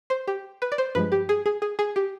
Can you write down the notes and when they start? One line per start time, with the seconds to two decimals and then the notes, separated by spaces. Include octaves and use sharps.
0.10 C5
0.27 G4
0.62 B4
0.72 D5
0.78 C5
0.95 G2 F3 G#3 B4
1.12 G4
1.29 G#4
1.46 G#4
1.62 G#4
1.79 G#4
1.96 G4